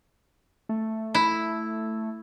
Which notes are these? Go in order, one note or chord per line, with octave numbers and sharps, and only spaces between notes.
A3
E4